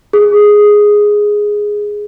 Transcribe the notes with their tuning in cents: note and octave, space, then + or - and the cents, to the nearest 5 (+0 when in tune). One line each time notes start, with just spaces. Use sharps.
G#4 +0